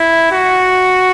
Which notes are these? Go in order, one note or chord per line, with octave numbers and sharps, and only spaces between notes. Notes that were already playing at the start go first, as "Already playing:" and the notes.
Already playing: E4
F#4